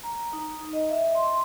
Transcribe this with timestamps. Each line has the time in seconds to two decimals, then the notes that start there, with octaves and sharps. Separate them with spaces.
0.03 A#5
0.33 D#4
0.73 D#5
0.89 E5
1.15 C6